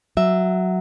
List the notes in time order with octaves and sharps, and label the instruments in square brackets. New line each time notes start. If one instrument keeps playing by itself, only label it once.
[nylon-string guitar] F#3 E5